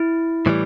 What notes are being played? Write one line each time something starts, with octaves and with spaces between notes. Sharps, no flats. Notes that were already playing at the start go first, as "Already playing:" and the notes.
Already playing: E4
A2 E3 G3